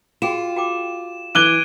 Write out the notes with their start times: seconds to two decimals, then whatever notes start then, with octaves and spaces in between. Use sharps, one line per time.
0.22 F4 F#4 G#4 G5 E7
0.56 F#4 G5 D6
1.35 E3 D6 F#6 G#6 D7 D#7 G7